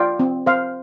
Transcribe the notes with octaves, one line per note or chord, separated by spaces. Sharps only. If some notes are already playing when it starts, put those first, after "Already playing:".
Already playing: F4 D5 G5
C4
C4 C5 F5